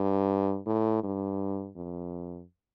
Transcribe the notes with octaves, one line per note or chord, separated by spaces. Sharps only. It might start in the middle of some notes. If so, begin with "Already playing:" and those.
Already playing: G2
A2
G2
F2